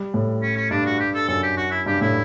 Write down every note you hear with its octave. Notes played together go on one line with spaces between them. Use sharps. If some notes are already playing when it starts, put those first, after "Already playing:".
Already playing: G3
A2
C#4
C#4
G2 D4
F#4
G4
A4
F#2 A4
G4
F#4
E4
G2 G4
A2 E4